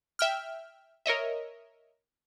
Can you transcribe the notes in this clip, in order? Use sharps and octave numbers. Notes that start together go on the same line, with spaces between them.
E5 G5 F6
A#4 C#5 D#5 E5